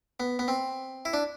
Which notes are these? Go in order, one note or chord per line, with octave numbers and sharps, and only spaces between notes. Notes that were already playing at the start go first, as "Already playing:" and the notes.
B3
B3
C4
E4
D4